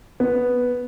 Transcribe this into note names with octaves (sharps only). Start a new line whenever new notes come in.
B3